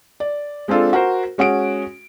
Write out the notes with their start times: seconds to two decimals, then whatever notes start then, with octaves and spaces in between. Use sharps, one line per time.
0.20 D5
0.68 G#3 C4 D4 F4 A4
0.93 F#4 A#4 C5
1.38 G#3 C#4 F#4 D#6 D7